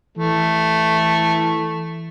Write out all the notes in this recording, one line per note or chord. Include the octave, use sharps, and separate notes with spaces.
E3 A3